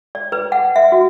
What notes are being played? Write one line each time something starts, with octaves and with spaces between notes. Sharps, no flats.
D5
B4
F#5
E5
F#4